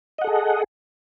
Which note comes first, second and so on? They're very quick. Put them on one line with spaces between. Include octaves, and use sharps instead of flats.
D#5 F#5 A4 G#4